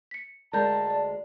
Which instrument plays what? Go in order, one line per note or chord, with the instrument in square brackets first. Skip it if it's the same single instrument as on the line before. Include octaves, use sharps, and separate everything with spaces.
[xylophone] B6 C#7
[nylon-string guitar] D2 G#3 A#4 [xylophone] D5 A#5 G6 [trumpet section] A5
[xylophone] D5